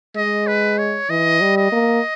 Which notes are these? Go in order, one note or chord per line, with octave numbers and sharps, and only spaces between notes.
G#3 D#5
B4
C#5
E3 D#5
G3
D#5
A#3